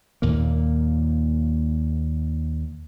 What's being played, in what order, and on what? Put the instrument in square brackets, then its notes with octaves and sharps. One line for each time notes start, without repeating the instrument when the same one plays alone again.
[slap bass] D#2 A#2 A#3